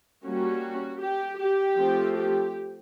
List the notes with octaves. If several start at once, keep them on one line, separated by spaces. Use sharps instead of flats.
G3 A#3 C#4 F#4
G4
G4
F3 A3 C4
G4